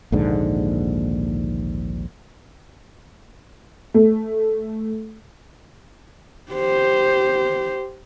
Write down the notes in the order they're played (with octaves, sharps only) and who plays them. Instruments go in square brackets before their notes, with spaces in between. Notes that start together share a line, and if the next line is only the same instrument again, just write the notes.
[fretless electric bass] A#1 D#2 G#2 D3
[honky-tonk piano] A3
[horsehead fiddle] G4 C5